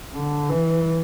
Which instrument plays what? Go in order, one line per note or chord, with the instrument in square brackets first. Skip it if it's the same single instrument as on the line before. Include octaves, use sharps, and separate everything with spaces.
[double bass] D3
E3